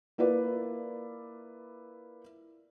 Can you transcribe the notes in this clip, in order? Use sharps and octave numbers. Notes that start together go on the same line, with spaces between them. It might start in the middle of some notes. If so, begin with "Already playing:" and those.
A#3 E4 F4 B4 D5